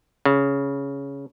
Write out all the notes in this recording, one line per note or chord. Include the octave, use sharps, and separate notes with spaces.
C#3